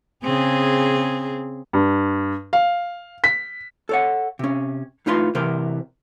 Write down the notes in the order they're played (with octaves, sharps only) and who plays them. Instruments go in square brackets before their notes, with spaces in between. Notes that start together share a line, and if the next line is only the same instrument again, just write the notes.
[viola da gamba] C#3 C4 G#4
[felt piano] G2
F5
B6
[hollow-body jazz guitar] A4 C#5 F#5
C3 C#4
A2 D#4 F4 B4 C6
C3 E3 A#4 C5